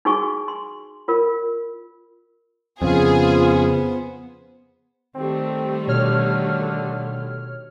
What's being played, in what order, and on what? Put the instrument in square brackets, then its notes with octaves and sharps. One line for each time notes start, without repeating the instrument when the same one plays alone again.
[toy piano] D#4 F#4 G#4 G#5 C#6
C6
F4 A#4
[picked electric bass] F2 C#3 [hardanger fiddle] B3 C5 [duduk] F4 [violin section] G#4
[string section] D#3 G3 A3 [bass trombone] C4
[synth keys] B2 C#5 F6 [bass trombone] D3